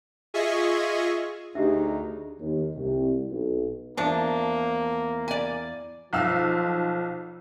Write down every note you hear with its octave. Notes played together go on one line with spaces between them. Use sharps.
F4 G#4 D#5 E5 G#5 C#6
D2 D4 D#4 G4 G#4 E5
D#2
C2
B1
E2 F3 A#3 D4 A5
D5 G#5
B1 F3 F5 E6